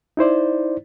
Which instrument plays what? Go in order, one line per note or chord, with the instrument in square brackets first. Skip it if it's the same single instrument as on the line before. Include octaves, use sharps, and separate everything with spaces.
[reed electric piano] D#4 E4 C5 D5